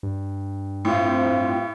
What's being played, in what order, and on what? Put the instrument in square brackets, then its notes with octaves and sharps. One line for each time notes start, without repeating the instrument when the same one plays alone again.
[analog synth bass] G2
[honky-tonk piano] A2 [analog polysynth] C4 F4